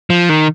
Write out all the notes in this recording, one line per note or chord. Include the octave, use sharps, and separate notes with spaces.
F3
D#3